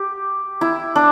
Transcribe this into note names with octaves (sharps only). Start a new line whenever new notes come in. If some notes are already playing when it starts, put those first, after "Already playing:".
Already playing: G4
E4
D4